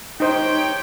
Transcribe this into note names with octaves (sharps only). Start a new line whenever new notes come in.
D#4 G4 C5 C#5 G5